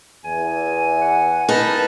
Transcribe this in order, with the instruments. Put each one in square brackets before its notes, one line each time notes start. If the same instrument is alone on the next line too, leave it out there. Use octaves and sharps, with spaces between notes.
[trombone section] E2 [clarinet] G#5
[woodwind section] F#5
[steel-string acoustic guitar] D#4 A#4 B4 [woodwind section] A5